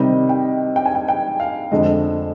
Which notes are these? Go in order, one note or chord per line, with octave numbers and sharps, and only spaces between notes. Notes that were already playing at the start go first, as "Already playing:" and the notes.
Already playing: C3 D#3 G3 D#5
G5
G5
G#5
G5
G5
F5
F2 D3 G#3 D#5